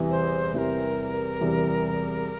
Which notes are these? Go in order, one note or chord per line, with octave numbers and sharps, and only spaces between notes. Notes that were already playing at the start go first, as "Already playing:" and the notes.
Already playing: E2 C3 E3 G3
C5
E2 C3 E3 G3 A#4 C5
E2 C3 E3 G3